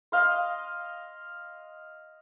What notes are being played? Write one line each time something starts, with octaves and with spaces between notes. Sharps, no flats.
D#5 F5 C6